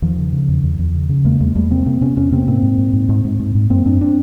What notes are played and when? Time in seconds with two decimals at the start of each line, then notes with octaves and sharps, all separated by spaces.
0.02 E2 D#3 F3
0.17 C#3
0.33 C#3
0.48 E2
0.63 E2
0.79 E2
0.94 C#3
1.09 C#3
1.25 E2 G#3 A#3
1.40 E2 G#3 A#3
1.55 E2 G3 A3
1.71 C3 A#3 C4
1.86 C3 A#3 C4
2.01 C3 B3 C#4
2.16 E2 B3 C#4
2.32 C3 A#3 C4
2.47 G#2 A#3 C4
2.63 G#2
2.78 G#2
2.93 G#2
3.09 G#2
3.25 G#2
3.39 G#2
3.55 G#2
3.70 F#2 A#3 C4
3.85 F#2 C4 D4
4.01 C4 D4